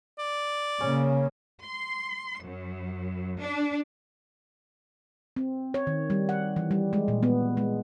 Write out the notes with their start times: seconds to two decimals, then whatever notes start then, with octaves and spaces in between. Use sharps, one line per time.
0.19 D5
0.81 C#3 A#3 C#4
1.64 C6
2.43 F#2
3.40 D4
5.36 C4
5.74 C#5
5.87 D#3
6.10 G3
6.29 F#5
6.56 E3
6.71 G3
6.93 G#3
7.08 A#2
7.23 B3
7.57 G#3